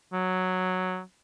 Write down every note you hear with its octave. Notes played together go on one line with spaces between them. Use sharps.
F#3